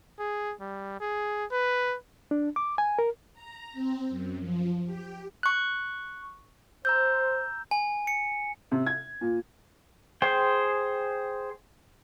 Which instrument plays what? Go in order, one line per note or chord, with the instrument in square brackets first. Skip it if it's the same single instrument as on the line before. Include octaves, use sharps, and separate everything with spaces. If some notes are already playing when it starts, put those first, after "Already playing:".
[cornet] G#4
G3
G#4
B4
[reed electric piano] D4
D6
G#5
A#4
[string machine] A#5
C4
F#2
F3
G4
[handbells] C#6 F#6
[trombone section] C5 [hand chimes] A#5 E6 G6
[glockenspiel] G#5
C#7
[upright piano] C3
G#6
A#2
[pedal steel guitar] G#4 C5 G5